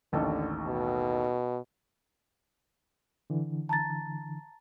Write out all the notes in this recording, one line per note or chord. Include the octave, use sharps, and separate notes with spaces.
A1 D#2 D3 A4
B2
D3 E3
A5 A#5 A6